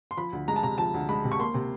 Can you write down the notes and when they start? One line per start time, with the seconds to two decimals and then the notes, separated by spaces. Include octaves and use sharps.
0.11 C6
0.17 F3 B5
0.33 D2
0.48 G#3 A#5
0.56 A5
0.63 C3 A#5
0.78 F3 A5
0.94 D2
1.09 G#3 B5
1.25 C3
1.31 C#6
1.39 A#3 C6
1.54 C3